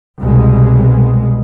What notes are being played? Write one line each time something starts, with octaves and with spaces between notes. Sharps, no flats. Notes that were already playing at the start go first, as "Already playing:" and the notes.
C2 B2 G#3